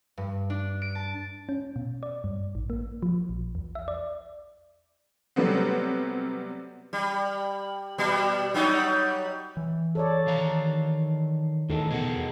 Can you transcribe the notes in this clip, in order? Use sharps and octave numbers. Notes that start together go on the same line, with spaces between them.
G2
D4
D7
A5
C#4
B2
D5
G2
A1
A#3
F3
A#1
E2
E5
D5
C3 F#3 G3 A3 B3 C4
G3
B2 G3
F#3 G3 D#4
E3
A4 C#5 D5
D#3 F5 A#5
E2 A2 D#3 D#4 A4 A#4
B2 G#4 A#4 F#5